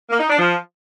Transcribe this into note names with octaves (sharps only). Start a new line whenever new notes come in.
A#3
D#4
D4
F3